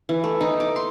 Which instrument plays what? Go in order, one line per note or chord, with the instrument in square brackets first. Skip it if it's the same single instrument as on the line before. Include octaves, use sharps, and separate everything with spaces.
[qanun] E3
A3
D#4
D6
C6